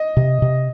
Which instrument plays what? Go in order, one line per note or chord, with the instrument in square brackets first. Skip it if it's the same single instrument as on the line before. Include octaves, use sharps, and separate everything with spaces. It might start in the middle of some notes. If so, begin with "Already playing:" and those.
Already playing: [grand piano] D#5
[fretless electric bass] C3
C3